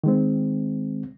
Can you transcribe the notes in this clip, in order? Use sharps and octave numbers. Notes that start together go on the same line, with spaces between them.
D#3 G#3 C4